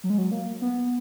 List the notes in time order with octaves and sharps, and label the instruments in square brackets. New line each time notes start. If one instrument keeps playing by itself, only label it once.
[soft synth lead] F#3
G#3
F#3
A#3
B3